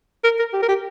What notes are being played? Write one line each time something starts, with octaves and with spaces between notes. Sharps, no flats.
A#4
A#4
G4
A#4
G4